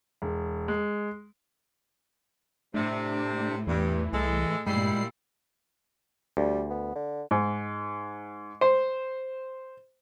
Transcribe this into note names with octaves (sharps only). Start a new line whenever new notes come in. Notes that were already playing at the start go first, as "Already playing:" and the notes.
E1
G#3
A2 C3 A3 D4
E2 G2 E3
C2 G#3 A4
G2 A#2 G3 G#3 E4 C7
D2 G3
B3
D3
G#2
C5